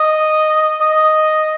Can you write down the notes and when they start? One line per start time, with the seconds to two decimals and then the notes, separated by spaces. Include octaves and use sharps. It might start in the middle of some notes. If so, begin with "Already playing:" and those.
Already playing: D#5
0.81 D#5